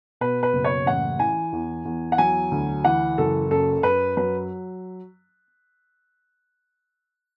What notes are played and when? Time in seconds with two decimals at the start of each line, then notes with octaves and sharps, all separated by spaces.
0.21 B2 B4
0.43 B4
0.53 F#1
0.64 C#5
0.86 A1 F#5
1.19 E3 G#5
1.53 E2
1.85 E2
2.12 F#5
2.18 F#3 G#5
2.51 D2
2.85 E3 F#5
3.18 F#1 A4
3.51 F#2 A4
3.83 F#2 B4
4.17 F#3 B4